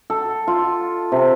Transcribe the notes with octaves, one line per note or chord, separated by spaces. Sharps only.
A4
F4
C3